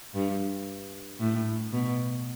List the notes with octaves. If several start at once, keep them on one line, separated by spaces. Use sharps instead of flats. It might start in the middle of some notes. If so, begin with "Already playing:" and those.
G2
A2
B2